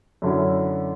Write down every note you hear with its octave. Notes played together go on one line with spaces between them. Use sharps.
F#2 D3 F#3 C#4 E4